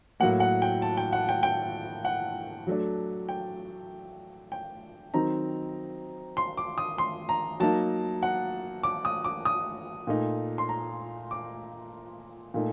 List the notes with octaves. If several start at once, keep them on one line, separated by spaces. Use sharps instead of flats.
A2 F#3 A#3 F#5
F#5
G5
A5
G5
F#5
G5
G5
F#5
F#3 A3 D4
G5
G5
D#3 F#3 C4 D#4 A#5
C6
D6
D#6
C6
A#5
F#3 A#3 D#4 A5
F#5
D6
D#6
D6
D#6
A#2 A3 D#4
C6
A#5
D6
A#2 A3 D#4